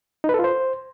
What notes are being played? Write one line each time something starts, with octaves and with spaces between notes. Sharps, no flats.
D#4
B4
A4
F4
C5